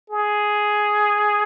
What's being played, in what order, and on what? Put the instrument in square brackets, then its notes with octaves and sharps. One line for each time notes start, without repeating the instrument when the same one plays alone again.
[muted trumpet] G#4